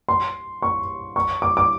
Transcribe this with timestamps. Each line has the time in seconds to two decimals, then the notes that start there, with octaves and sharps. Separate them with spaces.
0.09 C6
0.62 C#6
1.16 C#6
1.42 D6
1.57 D6